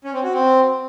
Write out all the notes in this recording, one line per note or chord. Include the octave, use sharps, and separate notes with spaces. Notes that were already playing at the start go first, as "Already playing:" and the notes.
C#4
C4
F#4
C4